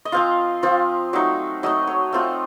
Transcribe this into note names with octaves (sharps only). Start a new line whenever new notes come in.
D#5
F3 C4 F4 F5
F3 C4 F4
F#3 A3 D#4
F#3 A3 D#4 D#5
C#5
A3 C4 F4